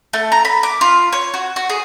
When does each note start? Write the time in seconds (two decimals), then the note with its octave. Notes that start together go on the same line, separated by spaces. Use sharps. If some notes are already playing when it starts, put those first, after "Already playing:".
0.13 A3
0.32 A#5
0.45 B5
0.63 D6
0.81 F4
1.13 C#5
1.34 F#4
1.56 F#4
1.70 G#4